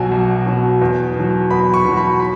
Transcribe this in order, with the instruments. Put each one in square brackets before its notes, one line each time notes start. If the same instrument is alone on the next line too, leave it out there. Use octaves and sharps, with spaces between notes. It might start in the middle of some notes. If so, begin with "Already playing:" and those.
Already playing: [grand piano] B1 B2 F#3 G#5
B1
B2 F#3
E2
B2 F#3
E2 B5
C#6
B2 F#3
B5
B5